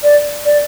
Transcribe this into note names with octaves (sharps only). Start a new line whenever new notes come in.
D5
D5